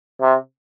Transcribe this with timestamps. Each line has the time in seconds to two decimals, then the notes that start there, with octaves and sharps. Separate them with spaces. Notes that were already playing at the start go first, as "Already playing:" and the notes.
0.21 C3